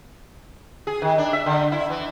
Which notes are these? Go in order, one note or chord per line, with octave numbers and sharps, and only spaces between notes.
G#4
D#3
D4
E5
D3
E4
E3